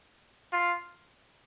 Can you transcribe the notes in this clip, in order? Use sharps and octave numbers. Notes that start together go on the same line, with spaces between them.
F4